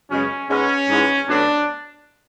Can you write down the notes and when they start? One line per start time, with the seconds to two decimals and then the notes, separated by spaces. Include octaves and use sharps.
0.10 F#2 C#3 G#3 B3 C#4
0.49 G#2 G#3 B3 C#4
0.89 G#2 E3 G#3 B3
1.29 B2 F#3 A3 D4